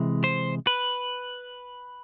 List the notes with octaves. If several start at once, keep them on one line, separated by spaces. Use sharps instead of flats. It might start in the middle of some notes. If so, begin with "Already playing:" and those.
Already playing: C3 E3 G#3
C5
B4